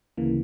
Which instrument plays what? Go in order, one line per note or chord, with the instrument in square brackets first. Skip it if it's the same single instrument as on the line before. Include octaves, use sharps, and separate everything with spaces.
[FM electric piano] D2 C#3 E3 A#3